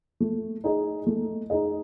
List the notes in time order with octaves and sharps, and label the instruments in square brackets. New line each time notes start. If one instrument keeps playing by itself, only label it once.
[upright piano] A3
D#4 G#4 D#5
A3
D#4 G#4 D#5